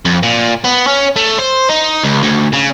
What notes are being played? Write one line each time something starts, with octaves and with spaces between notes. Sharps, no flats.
F2
A#2
B3
C#4
A3
C5
D#4
C#2
D2
C#3